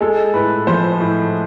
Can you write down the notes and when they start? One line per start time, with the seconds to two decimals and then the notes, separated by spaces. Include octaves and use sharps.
0.01 G#3 A4
0.34 A2 B4
0.67 F3 C5
1.00 A2